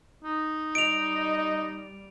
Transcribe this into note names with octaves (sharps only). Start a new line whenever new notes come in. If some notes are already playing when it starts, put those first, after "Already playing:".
D#4
G3 D#5 D7 F7